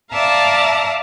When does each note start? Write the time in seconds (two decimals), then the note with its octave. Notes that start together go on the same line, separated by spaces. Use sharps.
0.12 D5 E5 F5 A5 A#5